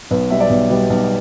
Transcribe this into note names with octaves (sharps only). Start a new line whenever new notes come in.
B1 B4
B2 G3 B3 E5
D5
B1
B2 G3 B3
B1